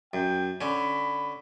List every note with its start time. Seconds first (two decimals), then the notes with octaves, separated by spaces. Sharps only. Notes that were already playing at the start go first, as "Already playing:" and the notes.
0.14 F#2 G5
0.61 D3 C#4 B5